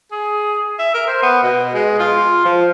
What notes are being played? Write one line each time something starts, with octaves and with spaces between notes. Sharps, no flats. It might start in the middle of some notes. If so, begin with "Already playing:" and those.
G#4
E5
A#4
C5
B3
B2
G#3
F4
F3